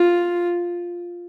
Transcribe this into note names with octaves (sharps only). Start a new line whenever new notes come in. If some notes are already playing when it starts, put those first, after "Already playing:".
Already playing: F4